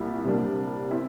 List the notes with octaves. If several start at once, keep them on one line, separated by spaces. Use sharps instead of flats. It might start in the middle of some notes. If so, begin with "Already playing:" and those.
Already playing: C2 A#2 G3 E4
C3 G3 A#3 D4
C4 E4